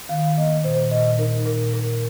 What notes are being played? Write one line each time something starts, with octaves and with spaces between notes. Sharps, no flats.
D#3 F5
A#3 D#5
A#2 C5
A#2 D#5
D#4 A#4
A#2 A#4
A#2 A#4